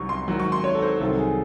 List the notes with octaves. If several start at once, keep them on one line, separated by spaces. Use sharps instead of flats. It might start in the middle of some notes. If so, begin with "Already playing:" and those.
Already playing: C2 C3 F#3 C#6
C6
G#2 D#3 F#3
C#6
C6
C#5
A4
C5
C2 C3 D#3 F#3 A4
G#4